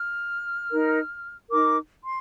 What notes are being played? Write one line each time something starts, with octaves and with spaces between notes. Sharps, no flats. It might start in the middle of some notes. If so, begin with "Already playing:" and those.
Already playing: F6
D#4 A#4
D#4 A#4 D6
C6